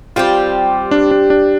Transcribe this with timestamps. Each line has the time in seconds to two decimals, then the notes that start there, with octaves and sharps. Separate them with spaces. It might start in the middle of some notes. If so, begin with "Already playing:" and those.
0.16 G3 C4 F4 G4
0.91 D4
1.11 D4
1.30 D4